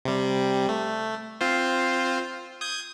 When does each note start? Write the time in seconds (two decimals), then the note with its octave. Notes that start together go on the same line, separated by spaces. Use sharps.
0.05 C3 G3
0.69 A3
1.41 C4 F4 C5
2.61 D#6 G6 G#6